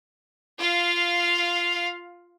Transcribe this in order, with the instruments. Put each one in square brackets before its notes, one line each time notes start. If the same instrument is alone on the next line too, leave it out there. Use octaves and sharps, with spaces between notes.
[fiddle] F4 F5